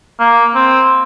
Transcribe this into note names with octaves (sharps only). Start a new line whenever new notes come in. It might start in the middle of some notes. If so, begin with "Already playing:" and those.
A#3
C4